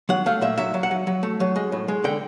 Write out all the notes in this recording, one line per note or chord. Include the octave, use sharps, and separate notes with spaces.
F#3 F#5
A3 F5
A#2 E5
F#3 E5
F#3
F#5
F#3
F#3
A3
F#3
G#3
A2
G#3
D3 G5